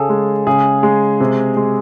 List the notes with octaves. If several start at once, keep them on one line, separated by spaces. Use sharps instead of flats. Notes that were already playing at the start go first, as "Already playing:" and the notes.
Already playing: C#3 G#4 A4
G#3
C#3 G#4
G#3
C3
G#3